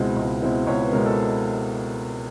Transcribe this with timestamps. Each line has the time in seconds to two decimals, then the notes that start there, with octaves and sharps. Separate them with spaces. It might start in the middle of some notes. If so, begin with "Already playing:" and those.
Already playing: C#2 B2 G#3 C4 E4
0.17 C#2
0.42 B2 G#3 C4 E4
0.67 C#2 C#5
0.80 B4
0.92 B2 G#3 C4 E4 A#4
1.06 A4